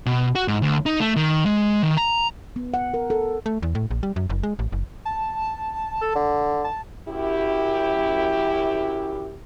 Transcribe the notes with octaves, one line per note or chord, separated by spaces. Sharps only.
B2
F#4
G#2
D2
D#4
A3
D#3
G#3
D#3
A#5
B3
F#5
A#4
A4
A3
E2
A2
A#1
G3
F#2
F#1
G#3
A1
F#1
A5
A4
D3
A5
F#2 E4 G4